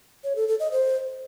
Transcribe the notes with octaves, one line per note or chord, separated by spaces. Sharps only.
C#5
A4
A4
D#5
C5